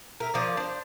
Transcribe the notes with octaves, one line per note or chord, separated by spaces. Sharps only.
A#4 E5
F3 A#3 D5
D4 C5